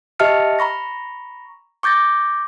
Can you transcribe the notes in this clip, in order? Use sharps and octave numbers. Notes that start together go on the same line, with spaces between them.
G4 D#5 E5 A5 F6 C#7
A#5 B5 C#6 A#6
C#6 D6 G6 A6 A#6